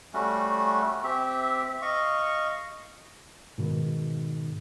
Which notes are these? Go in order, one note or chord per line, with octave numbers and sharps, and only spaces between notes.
G3 A3 C#4 F#4
C4 G4 E5
D#5 F5 C#6
G#2 B2 D#3